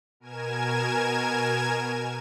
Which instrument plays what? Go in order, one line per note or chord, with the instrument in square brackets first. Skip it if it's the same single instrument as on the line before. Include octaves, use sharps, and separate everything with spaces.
[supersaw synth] B2 A#4 G#5 G#6 E7